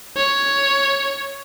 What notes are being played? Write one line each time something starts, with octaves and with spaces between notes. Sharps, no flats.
C#5